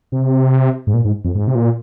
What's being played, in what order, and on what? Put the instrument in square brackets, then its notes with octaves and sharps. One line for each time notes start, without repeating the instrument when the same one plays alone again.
[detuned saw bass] C3
G#2
A#2
G#2
F2
G#2
C3
A#2